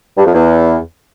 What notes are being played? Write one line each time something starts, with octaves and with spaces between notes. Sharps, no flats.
G2
F2
E2